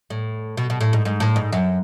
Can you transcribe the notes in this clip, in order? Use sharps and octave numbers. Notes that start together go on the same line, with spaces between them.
A2
B2
B2
A2
G#2
G#2
A2
G#2
F#2